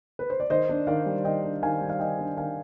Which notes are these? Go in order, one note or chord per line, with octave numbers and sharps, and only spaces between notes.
B4
C5
D5
D#3 C5 D#5
D4
D#3 D5 F5
G3
D#3 D#5 G5
D4
D#3 F5 G#5
G3
F5
D#3 D#5 G5
D4
D#3 F5 G#5